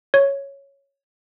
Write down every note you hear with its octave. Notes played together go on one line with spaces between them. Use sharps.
C#5